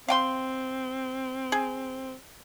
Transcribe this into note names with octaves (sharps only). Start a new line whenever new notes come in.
C4 F5 G5 C6
G#4